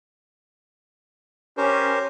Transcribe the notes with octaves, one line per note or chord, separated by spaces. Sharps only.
C#4 G4 A#4 C5